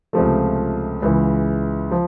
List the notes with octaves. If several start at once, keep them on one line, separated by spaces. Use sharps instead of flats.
C#2 C3 F3 A3
C#2 C#3 E3
F3